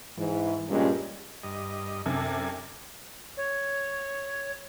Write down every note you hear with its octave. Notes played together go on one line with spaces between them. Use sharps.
G#2 E3
G2 A#2 G3 G#3 C#4
G2 D#5
F#2 C3 D4 A4 G#5
C#5